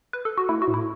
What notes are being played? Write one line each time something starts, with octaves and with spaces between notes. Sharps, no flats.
B4
A4
F#4
A3 E4
F#4
A2
E4